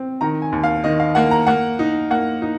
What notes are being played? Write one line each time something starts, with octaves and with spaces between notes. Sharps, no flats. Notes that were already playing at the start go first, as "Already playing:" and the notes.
Already playing: C4
D#3 A#5
G#5
D#2
F5
D#3 D#5
F5
A#3 F#5
A#5
A#3 F#5
D#4
A#3 F#5
D#4